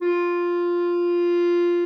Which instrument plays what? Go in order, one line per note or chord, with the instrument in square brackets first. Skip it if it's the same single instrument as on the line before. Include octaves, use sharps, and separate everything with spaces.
[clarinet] F4